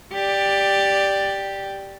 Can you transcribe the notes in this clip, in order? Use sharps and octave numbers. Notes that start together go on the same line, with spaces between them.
G4 D5